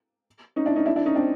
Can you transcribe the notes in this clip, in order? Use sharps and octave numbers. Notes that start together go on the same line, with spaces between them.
C#4 D#4
D4 E4
C#4 D#4
D4 E4
D4 E4
C#4 D#4
C4 D4